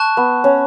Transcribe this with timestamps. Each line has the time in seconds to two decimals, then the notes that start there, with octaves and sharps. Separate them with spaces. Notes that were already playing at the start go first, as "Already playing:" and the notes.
Already playing: A5 C#6 F#6
0.17 B3
0.44 C#4